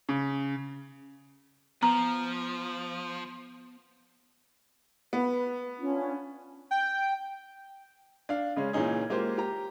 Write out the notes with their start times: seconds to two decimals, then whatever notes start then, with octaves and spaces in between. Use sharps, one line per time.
0.09 C#3
1.83 F3 B3 A#5
5.13 B3 B4
5.78 C#4 D4 F4
6.71 G5
8.29 D4 F5
8.56 C#3 G#3 C#4
8.73 A#2 E3 C#4 D#4 G#4
9.10 G#3 A#3 F4 G4 C5
9.38 G4 A#5